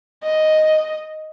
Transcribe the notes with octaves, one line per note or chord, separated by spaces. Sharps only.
D#5